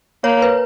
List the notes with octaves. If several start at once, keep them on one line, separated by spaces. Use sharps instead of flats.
A#3 C#5
B4